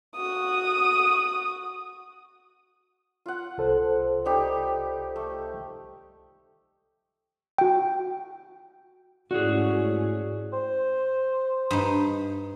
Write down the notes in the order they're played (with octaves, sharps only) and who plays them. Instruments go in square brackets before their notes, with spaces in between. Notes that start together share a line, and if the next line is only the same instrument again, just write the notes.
[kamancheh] F#4 D#6
[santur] F4 F#5
[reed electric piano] C2 A4 C5
[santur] G3 D#4 G4
A3
[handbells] F#4 G5
[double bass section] G#2 A3 C#4 [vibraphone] E4 D5 [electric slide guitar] F#4 G#4
[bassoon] C5
[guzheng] G2 D#4